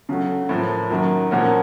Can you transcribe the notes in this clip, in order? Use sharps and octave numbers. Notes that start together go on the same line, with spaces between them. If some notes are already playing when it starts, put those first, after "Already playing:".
C#3 F#3 A3
A2 F3 A#3
F#2 D#3 F#3 A#3
A#2 F3 A#3 C#4 F#4